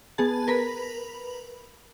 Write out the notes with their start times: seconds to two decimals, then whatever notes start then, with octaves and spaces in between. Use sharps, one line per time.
0.18 B3 G#4 A5
0.48 A#4 B4 B5